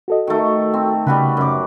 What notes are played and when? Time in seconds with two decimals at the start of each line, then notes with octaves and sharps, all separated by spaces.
0.08 F#4 A4 D#5
0.27 D#3 A3
0.74 C4
1.07 C#3 G3 F#4 B4
1.37 F#2 D6